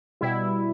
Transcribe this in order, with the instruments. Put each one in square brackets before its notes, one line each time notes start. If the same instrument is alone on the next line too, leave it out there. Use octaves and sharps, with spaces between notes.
[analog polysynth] B2 G3 E4